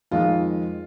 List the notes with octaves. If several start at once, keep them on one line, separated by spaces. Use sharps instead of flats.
F2 D#3 G#3 F4